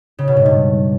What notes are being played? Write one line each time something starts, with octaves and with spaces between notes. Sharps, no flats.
C#3
B2
G#2
G2